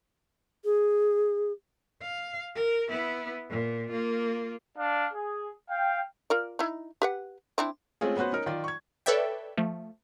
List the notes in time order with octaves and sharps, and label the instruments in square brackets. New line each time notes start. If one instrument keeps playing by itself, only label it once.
[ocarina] G#4
[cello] F5
A#4
B3 E4
A#2
A#3 F4
[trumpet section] D4 D5 F5
G#4
F5 G5
[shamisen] F4 A#4 D5
D#4 E4
G4 B4 F#5
C4 D4 E4
[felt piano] G#3 A3 C4 C#4 F4 G#4
B3 C#4 F#4 B4 C5
C#4 D#4 A#4
D#3 F4 D5
C#6 G#6
[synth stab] A4 B4 C#5 D5 E5 G5
F3 A3